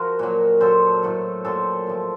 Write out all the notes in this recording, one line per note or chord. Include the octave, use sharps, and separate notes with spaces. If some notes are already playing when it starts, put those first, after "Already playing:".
Already playing: F3 F#4 A#4
A#2 F#3
A#2 F#3 A4 C5
A2 F#3
A#2 F#3 A4 C5
A2 F3